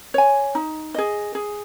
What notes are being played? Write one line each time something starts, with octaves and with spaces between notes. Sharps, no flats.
C#5 G#5
D#4
G#4 D#5
G#4